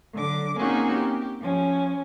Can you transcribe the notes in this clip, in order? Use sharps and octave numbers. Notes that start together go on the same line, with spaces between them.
D3 F#3 D6
A#3 C4 C#4 D#4 F#4 G#4
G4
F3 C#4